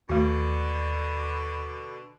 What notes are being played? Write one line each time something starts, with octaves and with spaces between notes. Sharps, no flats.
D#2 B2 D3 A3 F#4